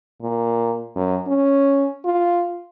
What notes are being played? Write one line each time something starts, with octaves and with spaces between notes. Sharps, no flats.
A#2
F#2
C#4
F4